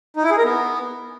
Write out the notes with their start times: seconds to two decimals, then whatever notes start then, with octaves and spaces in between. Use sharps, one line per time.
0.16 D#4
0.23 E4
0.30 G#4
0.38 A#4
0.45 B3